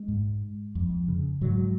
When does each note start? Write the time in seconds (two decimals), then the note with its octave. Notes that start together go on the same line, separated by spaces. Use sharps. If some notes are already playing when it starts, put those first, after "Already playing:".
Already playing: G#3
0.08 G#2
0.75 F2
1.08 C#3
1.41 G#2 F#3